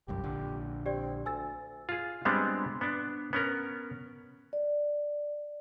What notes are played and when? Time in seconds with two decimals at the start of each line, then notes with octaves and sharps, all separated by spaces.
0.08 G1 C2 F#2 G4
0.23 A#1 D3
0.86 C4 G4 D5
1.26 D2 G#5 E6 A6
1.89 F4 G#4
2.25 G3 G#3 B3 C4 D4
2.81 B3 D4
3.33 B3 C#4 A#4
4.53 D5